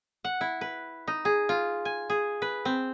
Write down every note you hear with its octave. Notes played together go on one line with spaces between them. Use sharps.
F#5
E4
B4
D#4
G#4
F4
G#5
G#4
B4
C4